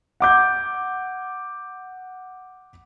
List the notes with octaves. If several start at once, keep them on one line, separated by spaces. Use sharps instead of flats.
F#5 D6 G6